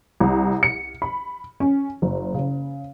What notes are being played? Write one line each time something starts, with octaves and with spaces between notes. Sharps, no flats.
C2
C#7
B5
C#4
F#1
C#3